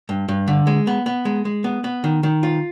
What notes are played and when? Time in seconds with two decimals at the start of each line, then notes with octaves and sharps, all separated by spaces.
0.09 G2
0.28 G2
0.48 D3
0.67 G#3
0.87 B3
1.06 B3
1.25 G#3
1.45 G#3
1.64 B3
1.84 B3
2.04 D#3
2.23 D#3
2.43 F4